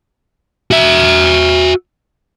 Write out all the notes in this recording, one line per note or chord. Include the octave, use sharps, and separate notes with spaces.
F#4 E5